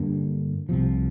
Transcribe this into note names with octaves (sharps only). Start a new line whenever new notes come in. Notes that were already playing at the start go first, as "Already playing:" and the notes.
Already playing: G2 D3 G3 A#3
C2 C3 F3